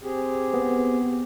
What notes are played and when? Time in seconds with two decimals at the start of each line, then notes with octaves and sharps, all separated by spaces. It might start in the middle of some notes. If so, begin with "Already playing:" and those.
0.02 C4 G4 G#4
0.54 B3